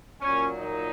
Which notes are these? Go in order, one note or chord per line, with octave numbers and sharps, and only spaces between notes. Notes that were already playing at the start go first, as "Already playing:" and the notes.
A#2 F#3 C#4
D#4